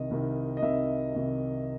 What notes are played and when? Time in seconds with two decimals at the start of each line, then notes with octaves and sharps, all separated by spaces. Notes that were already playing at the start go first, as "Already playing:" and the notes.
Already playing: C2 C3 D#3 D#5
0.10 C2 C3 D#3
0.57 D#5
0.62 C2 C3 D#3 E5
1.15 C2 C3 D#3